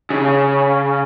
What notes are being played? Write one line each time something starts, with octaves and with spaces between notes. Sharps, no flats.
C#3